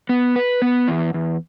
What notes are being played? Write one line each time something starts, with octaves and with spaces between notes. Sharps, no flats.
B3
B4
B3
E2
E2